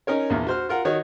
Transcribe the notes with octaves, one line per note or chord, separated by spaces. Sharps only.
C#4 D#4 A#4 C#5
A#1 E2
F#4 C5 F6
F4 A#4 F#5
D#3 F#4 C#5 D#5